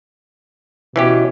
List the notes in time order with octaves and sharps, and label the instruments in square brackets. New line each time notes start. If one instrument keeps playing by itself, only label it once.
[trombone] B2 [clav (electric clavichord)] E3 C#4 G4